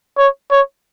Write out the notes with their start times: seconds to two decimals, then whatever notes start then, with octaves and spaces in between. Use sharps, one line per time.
0.18 C#5
0.51 C#5